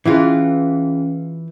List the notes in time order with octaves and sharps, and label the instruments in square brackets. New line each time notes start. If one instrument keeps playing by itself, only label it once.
[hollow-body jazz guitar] E3 E4 F4 [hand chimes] C#4 G#4